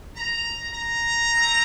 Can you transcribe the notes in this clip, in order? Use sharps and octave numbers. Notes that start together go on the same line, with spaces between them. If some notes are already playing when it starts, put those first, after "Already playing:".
A#5
A#5
A3 C4